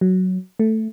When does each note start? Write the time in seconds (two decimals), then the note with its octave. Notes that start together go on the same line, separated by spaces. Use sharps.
0.01 F#3
0.59 A3